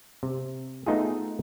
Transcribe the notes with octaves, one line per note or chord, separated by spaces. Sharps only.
C3
A3 B3 D#4 F4 G#4